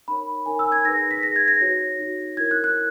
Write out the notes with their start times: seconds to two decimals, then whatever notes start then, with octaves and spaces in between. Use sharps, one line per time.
0.08 D#4 A#4 C#5 B5
0.46 D#4 A#4 C#5 G#5
0.59 E6
0.72 G#6
0.85 D#4 G#4 B4 A#6
1.11 B6
1.23 D#4 G#4 B4 A#6
1.36 G#6
1.48 A#6
1.61 D#4 F#4 C#5
1.99 D#4 F#4 C#5
2.37 E4 A#4 C#5 G#6
2.51 F#6
2.64 F#6